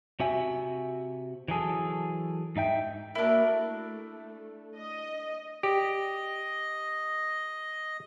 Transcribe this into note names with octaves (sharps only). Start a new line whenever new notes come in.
C3 F#4 E5 G#5
E3 F#3 G#4 A4
G#2 D#4 E5 G5
A#3 D4 E4 F#4 A#4
A3
D#5
G4 D5 D#5